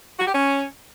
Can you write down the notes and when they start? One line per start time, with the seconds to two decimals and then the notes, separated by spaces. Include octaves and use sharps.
0.19 F#4
0.26 G4
0.34 C#4